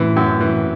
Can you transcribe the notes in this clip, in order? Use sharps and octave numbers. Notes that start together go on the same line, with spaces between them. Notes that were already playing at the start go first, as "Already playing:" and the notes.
Already playing: F#2 A2 E3
F#2
E3